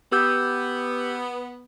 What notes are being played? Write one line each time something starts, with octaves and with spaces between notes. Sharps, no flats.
B3 G4 E6 G6